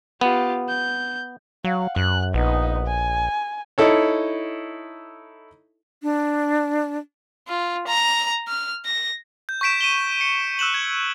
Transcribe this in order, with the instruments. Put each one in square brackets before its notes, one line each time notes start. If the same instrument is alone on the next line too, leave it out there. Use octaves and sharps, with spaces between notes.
[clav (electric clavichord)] B3 [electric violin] F4 G4
[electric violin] G6
[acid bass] F#3 [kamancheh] F5 F#5
[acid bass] F#2 [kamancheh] F#6
[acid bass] A#1 [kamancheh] B3 D#4
[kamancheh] G#5
[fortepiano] D#4 E4 A4 C#5
[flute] D4
[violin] F4
A#5
F6
A#6
[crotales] G6
C#6 G6 B6 D7 E7
D#7 E7 G7
C#7
E6 F#6 E7 F#7
G#6